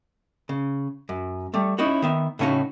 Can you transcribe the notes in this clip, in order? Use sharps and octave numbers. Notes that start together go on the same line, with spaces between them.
C#3
F#2
G3 A3
C#4 D#4 E4 F#4 C#5
D#3 B3 E5
A2 C#3 C#4 D#4 F#4